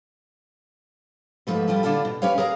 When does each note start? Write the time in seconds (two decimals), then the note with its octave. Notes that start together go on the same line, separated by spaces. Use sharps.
1.47 G#2 D#3 F3 A3 B4
1.67 G3 E4 F4 A4
1.83 D3 D4 E4 F4 A4
2.05 B2
2.22 C#4 G4 B4 C#5 F5
2.38 G#4 A#4 F5 A#5